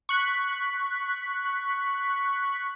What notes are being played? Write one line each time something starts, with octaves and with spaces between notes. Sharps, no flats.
C#6 F#6 B6